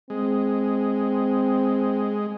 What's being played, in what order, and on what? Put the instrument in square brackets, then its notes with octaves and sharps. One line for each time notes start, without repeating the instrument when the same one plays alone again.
[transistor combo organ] G#3 [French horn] C4